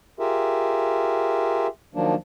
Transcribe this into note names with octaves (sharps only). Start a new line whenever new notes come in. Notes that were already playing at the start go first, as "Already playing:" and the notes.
F4 G4 G#4 A#4 E5
D#3 F3 F#3 A#3 D4